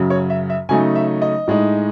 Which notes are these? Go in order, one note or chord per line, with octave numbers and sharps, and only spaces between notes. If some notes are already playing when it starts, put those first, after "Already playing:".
Already playing: F#2 C#3 F#3
C#5
E5
E5
C#3 F#3 A3 D#4 G#5
E5
D#5
A2 G#3 D#4